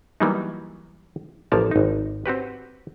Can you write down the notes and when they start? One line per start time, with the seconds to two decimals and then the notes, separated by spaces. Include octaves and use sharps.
0.20 E3 F#3 G3 A#3 B3 D#4
1.52 A1 F3 A#3 A#4 A5
1.71 G#1 D#4
2.26 C4 F#4 G4 B4